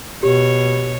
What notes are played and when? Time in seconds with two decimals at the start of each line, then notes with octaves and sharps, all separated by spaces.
0.23 B2 G4 C#5